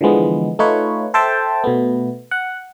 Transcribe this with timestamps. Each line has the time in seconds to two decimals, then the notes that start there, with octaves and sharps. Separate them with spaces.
0.01 D3 E3 F3 G#3 B3
0.59 A3 D#4 F4 B4 C#5
1.14 A4 C5 E5 G5 A5
1.64 B2 A3 B3
2.31 F#5